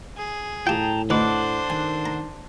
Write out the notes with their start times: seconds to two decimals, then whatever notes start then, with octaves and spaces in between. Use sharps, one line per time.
0.18 G#4
0.67 A2 F4 G4 G5 A5 A#5
1.10 D2 D4 D#4 A4 B4 C5 F#5 D6
1.70 D#3 G#5
2.06 A#5